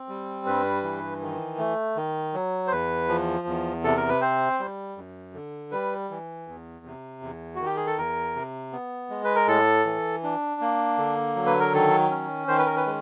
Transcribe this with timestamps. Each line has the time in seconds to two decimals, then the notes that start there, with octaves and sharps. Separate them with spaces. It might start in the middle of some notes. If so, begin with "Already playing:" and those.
Already playing: C4
0.09 G3
0.46 G2 B4
0.83 E3
1.22 D#3
1.58 A3
1.96 D#3
2.34 F#3
2.68 C5
2.72 E2 B4
3.09 F3
3.47 E2
3.84 C3 A4
3.97 A#4
4.09 B4
4.21 C4 C5
4.60 G3
4.97 F#2
5.34 D3
5.71 G3 B4
6.10 E3
6.48 E2
6.85 C3
7.22 E2
7.55 D#3 F#4
7.66 G4
7.76 G#4
7.87 A4
7.98 E2 A#4
8.35 C3
8.72 B3
9.10 G#3
9.24 B4
9.36 A#4
9.48 A2 A4
9.86 E3
10.23 D4
10.61 A#3
10.98 D3
11.35 F#3
11.46 B4
11.59 A#4
11.73 D#3 A4
12.11 C#4
12.48 D#3 C5
12.58 B4
12.66 A#4
12.76 B4
12.86 G#3